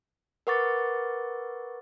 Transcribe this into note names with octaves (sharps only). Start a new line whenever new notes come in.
A#4 B4 F#5 C#6 D6 A6